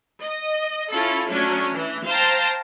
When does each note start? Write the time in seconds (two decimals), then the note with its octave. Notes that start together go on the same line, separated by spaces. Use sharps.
0.22 D#5
0.91 C#4 E4 F4 A4
1.30 F#3 A3 C#4 D4
1.71 E3
2.06 C5 F5 G5 A5 A#5